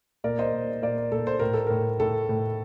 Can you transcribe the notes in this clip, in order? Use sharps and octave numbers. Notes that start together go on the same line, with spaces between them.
A#2 A#4 D5
C5 D#5
A#2
A#2 A#4 D5
A#4
A#2 A4
C5
A2 A#4
A4
A2 A#4
A2 A4
A2